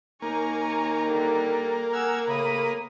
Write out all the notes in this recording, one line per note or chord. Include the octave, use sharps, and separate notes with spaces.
D#2 D#3 A#3 D#4 G#5 A#5 C#6
D3 G3
G#4 F#5 E6 F6 G#6
A2 C#3 B5 D#6